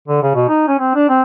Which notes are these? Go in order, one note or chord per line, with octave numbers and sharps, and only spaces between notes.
D3
C#3
B2
D#4
C#4
C4
D4
C4